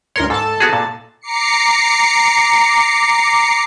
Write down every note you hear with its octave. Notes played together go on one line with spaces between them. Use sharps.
D2 A#4 C#5 C6
G#2 A4 A5
B3 F#4 G#4
A#2
A#5 D6 C7 C#7